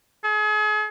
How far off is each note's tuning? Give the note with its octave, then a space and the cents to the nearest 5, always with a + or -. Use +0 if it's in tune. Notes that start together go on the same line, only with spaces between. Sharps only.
G#4 +40